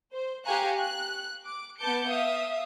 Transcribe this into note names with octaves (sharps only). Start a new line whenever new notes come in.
C5
G4 F5 G#5 A#5 C#6 F#6
F#6
D6
B3 B4 A5 D6 G6 C#7
E5 F5 D#6